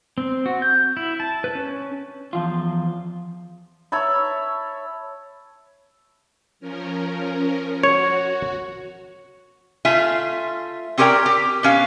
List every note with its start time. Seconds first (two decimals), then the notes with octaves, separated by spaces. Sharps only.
0.18 C4
0.46 F#4
0.62 G6
0.97 E4
1.20 A5
1.44 B4
1.55 C#4
2.33 E2 F3 F4
3.92 C#5 E5 A5 B5
6.60 F3 C#4 A#4
7.83 F#4 C#5
9.85 A3 F4 E5 G#5
10.98 C4 C#4 G4 A#4 D5 G5
11.26 G4
11.63 B2 C#4 F5